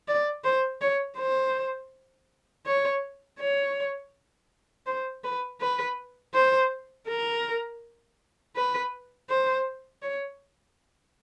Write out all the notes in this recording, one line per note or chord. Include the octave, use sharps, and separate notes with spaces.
D5
C5
C#5
C5
C#5
C#5
C5
B4
B4
C5
A#4
B4
C5
C#5